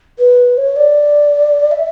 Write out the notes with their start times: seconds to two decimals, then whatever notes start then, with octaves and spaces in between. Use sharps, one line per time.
0.18 B4
0.57 C#5
0.76 D5
1.71 E5